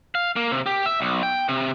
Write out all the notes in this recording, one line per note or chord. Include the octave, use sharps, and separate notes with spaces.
F5
A#3
C3
G4
E5
B1
G5
C3